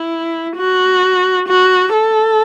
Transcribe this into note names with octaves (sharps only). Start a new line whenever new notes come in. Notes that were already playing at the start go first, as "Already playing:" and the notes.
Already playing: E4
F#4
F#4
A4